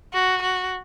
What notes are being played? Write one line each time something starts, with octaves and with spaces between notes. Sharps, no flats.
F#4
F#4